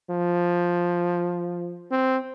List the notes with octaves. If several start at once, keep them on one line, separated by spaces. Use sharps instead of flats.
F3
C4